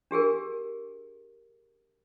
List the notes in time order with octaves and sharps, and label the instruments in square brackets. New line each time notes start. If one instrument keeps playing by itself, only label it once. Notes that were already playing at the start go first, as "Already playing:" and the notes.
[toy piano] D4 G4 G#4 A#4